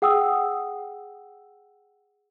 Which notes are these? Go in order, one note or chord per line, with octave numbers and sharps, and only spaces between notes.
G#4 F#5 G5 D#6 E6